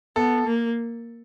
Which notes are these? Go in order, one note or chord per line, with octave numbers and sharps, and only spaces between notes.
B3 A4
A#3